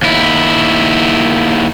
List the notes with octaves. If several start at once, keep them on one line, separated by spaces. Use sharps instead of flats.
D#2 E4